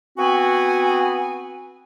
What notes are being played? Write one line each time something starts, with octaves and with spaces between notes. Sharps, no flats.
B3 C4 F#4 G#5